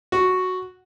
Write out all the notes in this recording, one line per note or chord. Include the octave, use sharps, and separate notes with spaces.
F#4